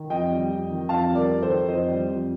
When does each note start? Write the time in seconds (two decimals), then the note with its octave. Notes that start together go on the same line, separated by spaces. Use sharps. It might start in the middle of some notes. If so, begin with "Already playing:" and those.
Already playing: D#3
0.10 F2 D#5 G5
0.30 G3
0.50 F2
0.70 D#3
0.89 F2 F5 A5
1.10 G3
1.15 A#4 D5
1.29 F2
1.42 A4 C5
1.49 D#3
1.68 F2 C5 D#5
1.88 G3
2.07 F2